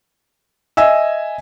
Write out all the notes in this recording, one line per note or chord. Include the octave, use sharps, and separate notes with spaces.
D#5 E5 G#5 E6